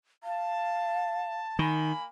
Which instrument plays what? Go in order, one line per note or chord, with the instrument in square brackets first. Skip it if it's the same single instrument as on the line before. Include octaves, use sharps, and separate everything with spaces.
[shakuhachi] F5 [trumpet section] A5
[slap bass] D#3 [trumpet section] A#3 B5 [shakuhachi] G#5